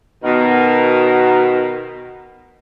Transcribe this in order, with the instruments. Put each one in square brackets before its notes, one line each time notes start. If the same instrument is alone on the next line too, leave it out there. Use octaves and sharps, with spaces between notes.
[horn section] B2 D#3 A#4